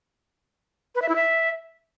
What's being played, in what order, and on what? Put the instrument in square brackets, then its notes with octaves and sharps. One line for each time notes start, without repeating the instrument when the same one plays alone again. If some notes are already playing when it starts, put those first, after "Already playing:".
[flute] B4
E5
E4
E5